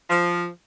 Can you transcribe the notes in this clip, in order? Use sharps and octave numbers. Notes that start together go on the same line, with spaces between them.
F3